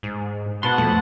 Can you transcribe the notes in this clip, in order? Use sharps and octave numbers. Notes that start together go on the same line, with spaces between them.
G#2
B2 B4 F#5 A5 C6
F2 A3